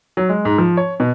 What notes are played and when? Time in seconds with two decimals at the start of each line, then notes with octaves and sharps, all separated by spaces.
0.17 F#3
0.29 G#3
0.45 G#2
0.58 F3
0.77 C#5
1.00 B2